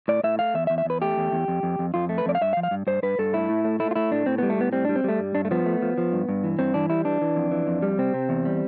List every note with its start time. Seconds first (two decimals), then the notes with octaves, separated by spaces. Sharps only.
0.08 A2 D5
0.24 A2 E5
0.39 A3 F5
0.54 E2 E5
0.67 E5
0.70 E2
0.78 E5
0.85 E2 B4
1.02 A3 G4
1.17 E2
1.32 E2
1.48 F2
1.63 F2
1.79 F2
1.94 F2 F4
2.09 A3
2.18 B4
2.26 F2 D5
2.35 F5
2.41 G2 E5
2.53 F5
2.57 F3
2.63 F5
2.71 G2
2.87 G2 C5
3.03 G2 B4
3.19 G2 A4
3.33 A3 E4
3.49 A2
3.65 A3
3.80 A3 E4
3.91 F4
3.96 A3 E4
4.12 A2 D4
4.26 A2 C4
4.38 G3 B3
4.50 A3
4.58 A2 B3
4.73 G3 C4
4.85 G3 D4
4.96 C4
5.04 G3 A3
5.20 G2
5.35 G2 D4
5.45 A3
5.51 F3 B3
5.66 A3
5.82 F3
5.98 F3
6.12 G2
6.29 G2
6.44 E3
6.59 G2 C4
6.74 E3 D4
6.90 G3 E4
7.05 E3 D4
7.21 E3
7.36 F2
7.51 E3
7.67 F2
7.82 G3
7.98 C3 C4
8.14 C3
8.29 E2
8.45 G3